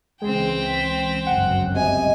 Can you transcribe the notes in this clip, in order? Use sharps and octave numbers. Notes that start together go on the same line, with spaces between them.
C#2 E3 G#3 C4 G5
B6
G1 C#2 F#2 F#5
C3 D#5 G#5